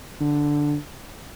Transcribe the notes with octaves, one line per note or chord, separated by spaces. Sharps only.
D3